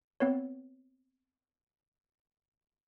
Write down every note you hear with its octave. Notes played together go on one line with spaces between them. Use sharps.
B3 C4 B4 C#5